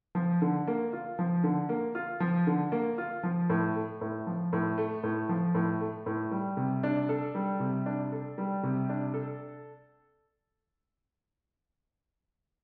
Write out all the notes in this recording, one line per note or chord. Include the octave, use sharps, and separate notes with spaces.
F3
D3
A#3
F4
F3
D3
A#3
F4
F3
D3
A#3
F4
F3
A2
A3
A2
F3
A2
A3
A2
F3
A2
A3
A2
G3
C3
D4
A4
G3
C3
D4
A4
G3
C3
D4
A4